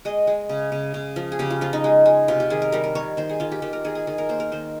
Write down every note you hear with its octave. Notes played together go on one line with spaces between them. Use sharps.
G#3 D#5
G#3
C#3
C#3
C#3
F3
G#4
C#3 G4
F4
F3 F4
D#4
G#3
G#3
C3 F4
G4
D#3 G#4
A#4
G3 A#4
A#4
D#3 C#5
D#3 C5
G#4
D#3 F4
G4
D#3 G4
A#4
D#3 G#4
G#4
D#3 G#4
A#4
A#3 C5
A#4
D#3 C5